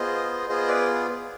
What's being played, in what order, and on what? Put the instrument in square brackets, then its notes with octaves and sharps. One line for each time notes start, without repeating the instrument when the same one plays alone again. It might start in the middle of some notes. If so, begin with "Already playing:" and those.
Already playing: [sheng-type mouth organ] B3 F4 G#4 C5 D#5
B3 F4 G#4 C5 D#5
B4 D5